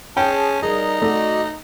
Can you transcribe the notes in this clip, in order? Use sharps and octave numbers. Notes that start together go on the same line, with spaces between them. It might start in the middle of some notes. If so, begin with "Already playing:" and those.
C#4 G#4 G5 A5
G3 D#4 G#4 A#4
A3 F#4 D5 D#5